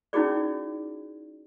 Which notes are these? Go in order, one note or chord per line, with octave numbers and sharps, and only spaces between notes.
C#4 D#4 E4 F#4 G#4 D5